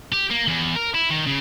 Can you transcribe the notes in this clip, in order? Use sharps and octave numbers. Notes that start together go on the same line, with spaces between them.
G4
A#3
E2
A#4
E4
D#3
C#3